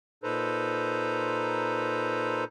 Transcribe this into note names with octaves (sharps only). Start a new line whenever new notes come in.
A#2 D#4 A4 B4 C5 A#5